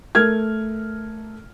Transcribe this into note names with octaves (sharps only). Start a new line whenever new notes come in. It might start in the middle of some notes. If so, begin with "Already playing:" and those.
A3 A#4 F6 G#6